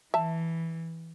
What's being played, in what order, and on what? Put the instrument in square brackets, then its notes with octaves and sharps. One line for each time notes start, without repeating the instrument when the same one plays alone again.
[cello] E3 [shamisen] E5 A5